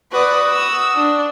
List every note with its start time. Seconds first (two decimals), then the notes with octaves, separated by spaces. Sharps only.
0.12 F#4 B4 D5 D#6
0.51 E6
0.96 D4